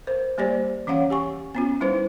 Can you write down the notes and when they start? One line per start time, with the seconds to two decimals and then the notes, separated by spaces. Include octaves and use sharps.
0.07 A#4 C5
0.38 G3 A#3 G4 C5 D5
0.87 E3 C#4 C#5 F5 F#5
1.10 G4 G#5 C#6
1.55 B3 C#4 F4
1.81 G3 D#4 E4 B4 C5